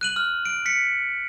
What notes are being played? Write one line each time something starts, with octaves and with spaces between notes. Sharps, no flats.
F#6 D#7 F#7
F6
D7
B6 C#7